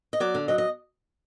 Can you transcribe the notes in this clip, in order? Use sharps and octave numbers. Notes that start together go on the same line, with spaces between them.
D#5
F#3 D5
D3
F#3 D#5
D#5